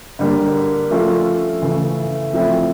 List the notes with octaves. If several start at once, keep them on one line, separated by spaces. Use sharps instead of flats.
D3 G3 A#3
F3 A3 C#4 F4 A4
C#3 E3 A3
F3 A3 C4 E4